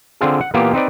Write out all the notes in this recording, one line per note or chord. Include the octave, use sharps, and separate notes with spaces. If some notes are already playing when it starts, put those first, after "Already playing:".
D3 C4 F4 G#4
F#5
A#2 E3 A#3 B3 F4 G4
C4 D#4 B4 D5